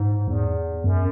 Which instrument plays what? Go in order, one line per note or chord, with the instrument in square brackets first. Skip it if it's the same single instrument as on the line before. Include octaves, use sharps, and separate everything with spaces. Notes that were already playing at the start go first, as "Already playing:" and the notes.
Already playing: [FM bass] G#2
E2
F#2